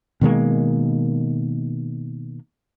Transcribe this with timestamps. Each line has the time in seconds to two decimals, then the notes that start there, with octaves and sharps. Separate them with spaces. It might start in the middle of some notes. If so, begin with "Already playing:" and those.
0.21 B2 D#3 G#3 A#3